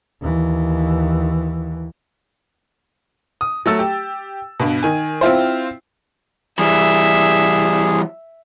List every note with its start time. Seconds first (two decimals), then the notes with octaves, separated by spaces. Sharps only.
0.21 D#2 E3
3.41 D#6
3.66 F#3 A3 E6 A6
3.79 G4
4.60 G2 B2
4.83 D#3 G#5
5.21 C4 E4 F4 C5
6.59 E3 G3 G#4 E5